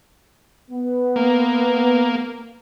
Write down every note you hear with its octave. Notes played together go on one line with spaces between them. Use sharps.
B3
A#3